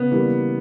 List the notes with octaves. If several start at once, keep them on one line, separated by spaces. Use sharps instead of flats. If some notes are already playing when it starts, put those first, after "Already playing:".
Already playing: C#3 B3
E3 G3 A#3